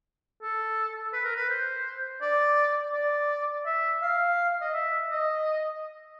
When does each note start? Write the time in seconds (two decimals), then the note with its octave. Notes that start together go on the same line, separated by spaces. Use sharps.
0.42 A4
1.13 B4
1.25 A#4
1.36 B4
1.50 C5
2.22 D5
2.93 D5
3.66 E5
4.02 F5
4.61 D#5
4.73 E5
5.10 D#5